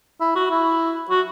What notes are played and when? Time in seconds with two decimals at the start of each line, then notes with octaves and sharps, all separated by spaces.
0.20 E4
0.35 F#4
0.51 E4
1.10 F#4